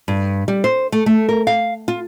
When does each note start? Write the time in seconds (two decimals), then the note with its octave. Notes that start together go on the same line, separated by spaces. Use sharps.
0.08 G2
0.48 G3
0.64 C5
0.92 A3
1.06 A3
1.29 A#4
1.47 F5
1.88 F4